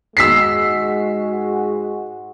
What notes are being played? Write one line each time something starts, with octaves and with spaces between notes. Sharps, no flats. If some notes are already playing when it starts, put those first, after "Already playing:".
G#2 G#3 F#4 E6 B6 C7